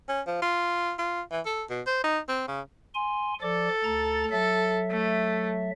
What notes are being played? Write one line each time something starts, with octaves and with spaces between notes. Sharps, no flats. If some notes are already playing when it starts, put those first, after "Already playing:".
C#4
F3
F4
F4
E3
A4
B2
C5
D#4
C4
C#3
G#5 C6
F3 A4 D5 D6
D2 A#5 A6
F#3 A4 E5
A3